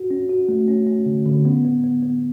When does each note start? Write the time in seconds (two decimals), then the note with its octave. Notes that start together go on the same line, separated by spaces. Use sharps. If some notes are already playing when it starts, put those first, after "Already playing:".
Already playing: F#4
0.10 C#4
0.29 F#4
0.49 A3
0.68 C#4
0.87 C#4
1.06 D3
1.26 D3
1.45 B3
1.64 B3
1.84 B3
2.03 B3